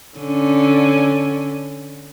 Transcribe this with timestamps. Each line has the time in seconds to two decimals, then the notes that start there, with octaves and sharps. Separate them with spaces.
0.18 D3 C#4